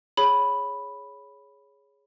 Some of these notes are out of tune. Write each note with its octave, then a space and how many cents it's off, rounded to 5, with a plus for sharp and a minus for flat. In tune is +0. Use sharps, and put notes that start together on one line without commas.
G#4 +0 C#5 +0 B5 +0